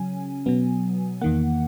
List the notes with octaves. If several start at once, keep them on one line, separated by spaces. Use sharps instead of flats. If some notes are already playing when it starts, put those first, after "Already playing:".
Already playing: C#3 F#3 C#4 G#5
B2 F#3 B3
E2 D#3 A#3 F#5